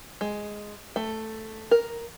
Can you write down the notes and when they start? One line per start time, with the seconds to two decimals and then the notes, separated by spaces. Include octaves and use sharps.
0.21 G#3
0.96 A3
1.71 A#4